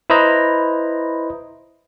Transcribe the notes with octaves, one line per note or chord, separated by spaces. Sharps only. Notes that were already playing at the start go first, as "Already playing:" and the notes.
E4 B4 C5 D#5 A#5